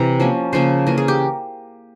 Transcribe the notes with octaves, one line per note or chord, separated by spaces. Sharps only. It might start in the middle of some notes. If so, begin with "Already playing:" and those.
Already playing: C3 E3 A#5
F3 A#3 C#4
C#3 F3 A#3 C#4 C5
E3 A#3 C#4 A#4
G#4
G4